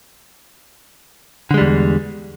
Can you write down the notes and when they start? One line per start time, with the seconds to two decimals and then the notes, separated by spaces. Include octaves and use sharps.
1.51 D3
1.54 G#3
1.58 G3
1.61 E2